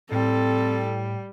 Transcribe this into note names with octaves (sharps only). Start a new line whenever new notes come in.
A2 G3 C4 A4